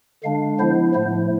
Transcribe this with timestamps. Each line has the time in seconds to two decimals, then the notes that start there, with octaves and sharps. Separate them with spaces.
0.23 D3 G#3 D4 F5
0.59 F3 B3 E4 C5
0.95 A2 F3 A3 C5